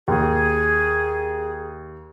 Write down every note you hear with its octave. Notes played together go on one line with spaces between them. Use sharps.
D#2 G#4